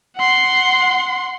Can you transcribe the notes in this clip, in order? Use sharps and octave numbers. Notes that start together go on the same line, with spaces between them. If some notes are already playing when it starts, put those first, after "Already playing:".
F#5 C6